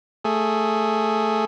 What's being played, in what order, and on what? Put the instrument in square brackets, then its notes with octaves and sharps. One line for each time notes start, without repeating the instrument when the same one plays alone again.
[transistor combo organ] A3 G#4